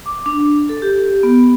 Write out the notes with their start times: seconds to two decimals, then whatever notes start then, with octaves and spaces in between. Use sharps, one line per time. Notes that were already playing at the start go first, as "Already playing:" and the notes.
0.06 D6
0.26 D4
0.69 A4
0.82 G4
1.23 B3